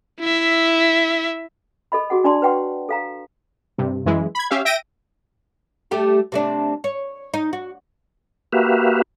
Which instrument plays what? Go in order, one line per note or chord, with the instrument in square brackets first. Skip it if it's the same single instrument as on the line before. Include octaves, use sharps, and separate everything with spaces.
[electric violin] E4 E5
[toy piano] A4 D#5 B5
F#4 G#4 F#5
D4 D5 A5 C6
B4 C#5 F#5 G5 C6 C#6
A4 F5 A#5
[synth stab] G2 C3
F#2 E3 G#3 E4
B5 G#6
C#4 G4 E5 F5
E5 G5 A#6 D7 D#7
[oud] G3 A3 G4
C3 A3 D4
C#5
D#4
F#4
[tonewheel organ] A#3 F#4 G4 B4 E5 F5